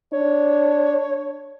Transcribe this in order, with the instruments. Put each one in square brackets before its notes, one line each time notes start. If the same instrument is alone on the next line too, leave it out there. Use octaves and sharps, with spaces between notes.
[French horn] D4 [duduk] C#5